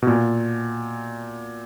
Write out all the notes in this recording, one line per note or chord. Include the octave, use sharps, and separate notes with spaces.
B2
A#2